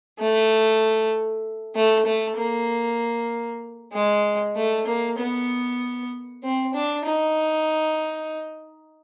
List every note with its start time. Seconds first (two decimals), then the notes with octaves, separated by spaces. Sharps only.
0.19 A3
1.76 A3
2.06 A3
2.37 A#3
3.93 G#3
4.56 A3
4.87 A#3
5.18 B3
6.43 C4
6.74 D4
7.05 D#4